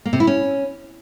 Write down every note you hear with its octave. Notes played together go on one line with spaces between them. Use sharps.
A#3
C3
E4
C#4